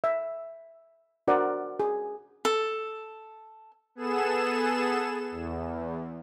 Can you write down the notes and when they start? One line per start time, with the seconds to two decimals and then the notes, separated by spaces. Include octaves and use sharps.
0.04 E5
1.27 D4 F#4 A#4 C5 D5 F#5
1.80 G#4
2.45 A4
3.95 B3 G#4 A4 E7
5.31 E2